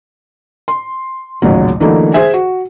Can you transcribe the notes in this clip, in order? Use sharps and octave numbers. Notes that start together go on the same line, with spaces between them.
C6
A1 D#2 A#2 C#3 F#3
D3 E3 F#3 A3 A#3 D#4
G#4 C5 E5 G#5
F#4